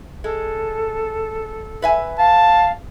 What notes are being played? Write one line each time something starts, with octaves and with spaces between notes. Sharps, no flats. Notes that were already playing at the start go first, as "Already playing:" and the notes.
G#3 A4
B4 E5 G#5
F5 A5